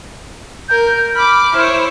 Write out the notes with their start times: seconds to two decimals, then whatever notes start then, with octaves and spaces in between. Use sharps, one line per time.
0.69 A#4 G6
1.15 B5 D6 F6
1.54 E4 C5 C#5